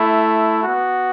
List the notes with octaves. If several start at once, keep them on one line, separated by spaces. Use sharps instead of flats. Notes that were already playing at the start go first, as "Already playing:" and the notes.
Already playing: A3 E4
B3 F#4